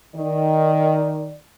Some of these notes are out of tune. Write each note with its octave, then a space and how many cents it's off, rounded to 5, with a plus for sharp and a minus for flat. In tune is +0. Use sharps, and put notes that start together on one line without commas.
D#3 +0 D5 +0